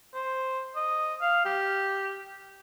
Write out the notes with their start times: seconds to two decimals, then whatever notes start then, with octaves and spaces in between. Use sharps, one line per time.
0.14 C5
0.76 D#5
1.21 F5
1.45 G4